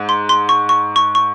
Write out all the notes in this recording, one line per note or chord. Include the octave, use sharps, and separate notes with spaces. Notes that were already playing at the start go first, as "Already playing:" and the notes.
Already playing: G#2
C6
C6
C#6
C#6
C#6
C#6